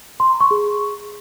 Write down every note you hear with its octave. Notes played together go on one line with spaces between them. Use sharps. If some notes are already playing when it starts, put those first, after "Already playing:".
C6
A#5
C#6
G#4